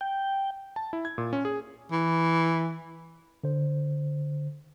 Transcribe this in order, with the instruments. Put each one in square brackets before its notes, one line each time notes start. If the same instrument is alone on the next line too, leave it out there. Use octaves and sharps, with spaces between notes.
[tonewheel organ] G5
[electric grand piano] A5
E4
G#6
A#2
C#4
G#4
[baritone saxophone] E3
[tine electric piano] D3 C5